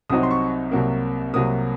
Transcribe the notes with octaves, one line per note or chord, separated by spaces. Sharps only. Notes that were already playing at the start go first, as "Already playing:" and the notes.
C2 C3 F#3 C4 D#4 D#6
C6
C#6
C2 C3 F#3 A#3
C2 C3 F#3 A#3 D#6